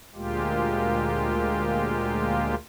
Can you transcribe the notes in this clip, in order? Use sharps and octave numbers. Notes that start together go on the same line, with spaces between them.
D2 A#2 G#3 A#3 F4 G4